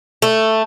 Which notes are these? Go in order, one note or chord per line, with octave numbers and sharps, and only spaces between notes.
A3